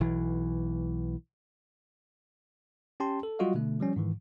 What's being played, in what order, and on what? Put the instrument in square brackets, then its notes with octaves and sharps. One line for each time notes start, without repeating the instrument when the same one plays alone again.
[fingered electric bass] B1 E3
[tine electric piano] C#4 G4 G5 A5 C6
A4
F#3 G3 F4 F#4 D#5 F5
B2 D3 A3
F3 G3 C#4
G#2 D#3 E3